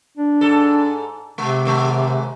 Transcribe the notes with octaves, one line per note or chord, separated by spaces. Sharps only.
D4
G#2 A4
C3 G#3
D#2 G#2 G#3